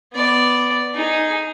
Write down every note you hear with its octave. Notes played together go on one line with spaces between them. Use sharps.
B3 D5
D#4 G#4